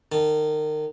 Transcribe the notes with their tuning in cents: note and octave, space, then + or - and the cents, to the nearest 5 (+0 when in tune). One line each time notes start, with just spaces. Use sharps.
D#3 -30 A5 -25